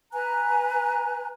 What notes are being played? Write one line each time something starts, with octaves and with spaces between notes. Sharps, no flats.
B4 G#5 A#5 F#6